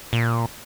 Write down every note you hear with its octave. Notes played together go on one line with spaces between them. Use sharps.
A#2